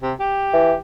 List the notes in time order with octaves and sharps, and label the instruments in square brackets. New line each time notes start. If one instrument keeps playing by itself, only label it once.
[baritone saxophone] C3
G4
[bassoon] E3